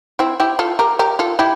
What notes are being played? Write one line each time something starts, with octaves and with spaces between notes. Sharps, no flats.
C4 E4
E4 G4
F4 A4
G4 A#4
G4 A#4
F4 A4
E4 G4